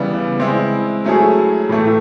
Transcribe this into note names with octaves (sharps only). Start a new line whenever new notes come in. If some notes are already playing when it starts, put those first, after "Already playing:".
Already playing: C#3 E3 G3 B3 E4
G#3 C4 E4
F#3 A3 C#4 E4 G#4
A2 E3 A3